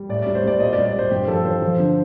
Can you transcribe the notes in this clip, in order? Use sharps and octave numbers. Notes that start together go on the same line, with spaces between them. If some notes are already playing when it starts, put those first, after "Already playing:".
Already playing: G3
A2 D5
D5
G3
C5
G3 D5
A#2 D#5
D5
G3
D5
G3 C5
G2 G4
F3 A4
F3 C5
F3
D3